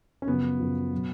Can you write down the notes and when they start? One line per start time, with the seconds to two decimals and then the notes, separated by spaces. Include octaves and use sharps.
0.22 C#4
0.27 F#2 C#3 F3 B3
0.60 F#2 C#3 F3
0.94 B2 F#3